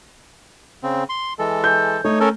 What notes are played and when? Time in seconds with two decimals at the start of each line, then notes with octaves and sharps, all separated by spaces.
0.83 C#3 C4
1.09 C6
1.39 E3 G#3 A4
1.64 G6
2.04 A3 D#4 C#5
2.20 C#4 A4 A#4